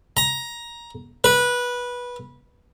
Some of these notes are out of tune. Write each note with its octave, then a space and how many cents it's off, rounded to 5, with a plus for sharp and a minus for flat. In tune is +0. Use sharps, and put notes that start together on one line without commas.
A#5 +15
B4 -15